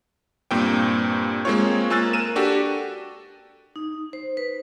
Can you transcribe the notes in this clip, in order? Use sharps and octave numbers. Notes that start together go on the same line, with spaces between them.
G2 A#2 A#3 C4 G5
G#3 A#3 C4 F4 C#5
A#3 F4 G#5 E6 F#6 A6
A#4 D#7 E7
D4 F#4 G4 A4
D#4
C5
B4